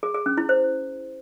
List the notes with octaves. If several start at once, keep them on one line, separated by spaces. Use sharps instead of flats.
G#4
G#4
C#4
E4
C5